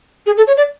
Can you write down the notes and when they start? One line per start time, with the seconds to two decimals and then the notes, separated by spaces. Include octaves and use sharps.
0.26 G#4
0.37 A4
0.47 C#5
0.57 D5